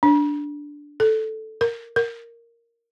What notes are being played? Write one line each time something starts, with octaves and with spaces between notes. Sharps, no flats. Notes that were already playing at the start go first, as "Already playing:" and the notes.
D4
A4
A#4
A#4